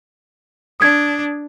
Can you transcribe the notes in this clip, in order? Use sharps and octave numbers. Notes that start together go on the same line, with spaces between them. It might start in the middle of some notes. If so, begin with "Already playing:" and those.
D4 D#6 G#6